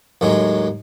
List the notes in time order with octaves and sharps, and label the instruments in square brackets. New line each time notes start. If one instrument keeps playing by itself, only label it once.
[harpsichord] D#2 A2 F#3 G#3